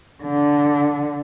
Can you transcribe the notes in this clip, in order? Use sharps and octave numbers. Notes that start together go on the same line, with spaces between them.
D3